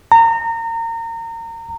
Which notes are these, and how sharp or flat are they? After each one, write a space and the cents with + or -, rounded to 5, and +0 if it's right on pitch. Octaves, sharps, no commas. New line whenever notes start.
A#5 -30